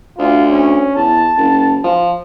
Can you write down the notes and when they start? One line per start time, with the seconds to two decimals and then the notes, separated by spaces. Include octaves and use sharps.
0.18 D2 F4
0.50 C#4
0.96 E2 A5
1.37 F#1
1.84 F3